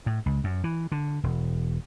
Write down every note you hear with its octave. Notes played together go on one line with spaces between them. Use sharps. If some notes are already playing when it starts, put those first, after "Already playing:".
A2
C#2
F#2
E3
D3
E1